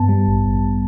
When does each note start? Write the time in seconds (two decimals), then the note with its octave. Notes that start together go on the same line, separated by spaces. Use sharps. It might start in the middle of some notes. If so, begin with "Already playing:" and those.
Already playing: G2 B3 A5
0.09 G3
0.27 A1
0.46 A1